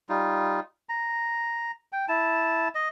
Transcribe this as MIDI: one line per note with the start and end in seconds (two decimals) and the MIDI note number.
0.09 0.60 55
0.09 0.60 63
0.09 0.60 65
0.89 1.71 82
1.92 2.06 79
2.08 2.68 64
2.08 2.68 81
2.75 2.88 75